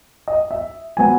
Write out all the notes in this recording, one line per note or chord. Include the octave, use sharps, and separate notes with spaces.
D#5
E5
F#3 B3 G#5